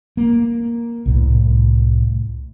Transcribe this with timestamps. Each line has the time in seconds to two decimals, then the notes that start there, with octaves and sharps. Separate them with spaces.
0.17 A#3
1.06 C2 A2